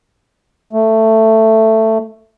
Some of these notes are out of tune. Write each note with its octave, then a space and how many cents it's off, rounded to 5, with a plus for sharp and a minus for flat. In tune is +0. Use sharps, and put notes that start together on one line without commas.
A3 +10